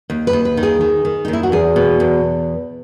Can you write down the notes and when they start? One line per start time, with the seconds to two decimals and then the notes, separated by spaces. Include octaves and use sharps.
0.10 D#2
0.27 B4
0.33 D#2
0.45 B4
0.57 D#3
0.63 G#4
0.81 D#3
1.05 D#3
1.25 D#2 D#4
1.33 E4
1.43 F#4
1.52 E2 G#4
1.76 B2
2.00 E2